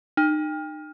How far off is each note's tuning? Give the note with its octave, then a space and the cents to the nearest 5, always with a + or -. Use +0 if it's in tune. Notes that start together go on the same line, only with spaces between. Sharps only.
D#4 -30